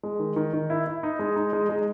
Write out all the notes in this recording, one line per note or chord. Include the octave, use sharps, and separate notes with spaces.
G#3
D#3
D#3
D#3
E4
E4
D#4
G#3
D#4
G#3
G#3